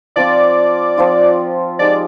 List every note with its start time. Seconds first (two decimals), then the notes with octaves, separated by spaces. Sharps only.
0.16 F3 C4 F4 D5
0.98 F3 C4 F4
1.79 F3 G#3 D#4 G4 D5